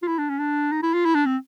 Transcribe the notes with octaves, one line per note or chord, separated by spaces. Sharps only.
F4
E4
D4
C#4
D4
D#4
E4
F4
E4
D4
C4